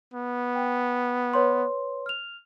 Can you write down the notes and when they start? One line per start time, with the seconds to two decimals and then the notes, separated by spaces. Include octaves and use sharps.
0.14 B3
0.55 G5
1.34 B4 C#5 C6
2.06 F6 F7